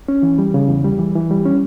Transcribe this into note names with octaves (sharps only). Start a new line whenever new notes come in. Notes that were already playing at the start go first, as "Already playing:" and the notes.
C#4
E3
G3
C#3
E2
G3
E3
E3
G3
C#4